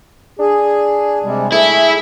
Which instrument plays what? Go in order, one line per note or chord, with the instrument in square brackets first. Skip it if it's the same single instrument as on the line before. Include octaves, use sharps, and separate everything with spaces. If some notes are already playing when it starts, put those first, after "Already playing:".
[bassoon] D4 [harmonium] G#4
[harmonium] C3 G3 G#3
[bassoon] A3 [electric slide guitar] E4 [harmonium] G#4